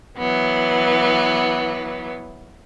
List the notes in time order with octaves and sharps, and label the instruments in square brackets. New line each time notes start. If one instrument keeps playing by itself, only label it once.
[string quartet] E3 F#3 B3